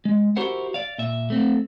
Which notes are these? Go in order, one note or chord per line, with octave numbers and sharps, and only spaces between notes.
G#3
E4 F#4 G4 A#4 C5 F#5
D5 F5
A#2 E5
A3 C4